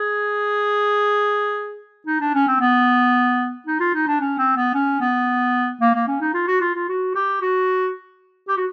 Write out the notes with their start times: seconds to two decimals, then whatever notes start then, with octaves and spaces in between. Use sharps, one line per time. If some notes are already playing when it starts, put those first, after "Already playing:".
Already playing: G#4
2.07 D#4
2.21 D4
2.35 C#4
2.48 C4
2.60 B3
3.67 D#4
3.80 F4
3.94 D#4
4.07 D4
4.21 C#4
4.38 C4
4.57 B3
4.74 C#4
5.00 B3
5.81 A#3
5.94 A#3
6.08 C#4
6.21 D#4
6.34 F4
6.47 F#4
6.61 F4
6.75 F4
6.89 F#4
7.15 G4
7.41 F#4
8.48 G4
8.57 F#4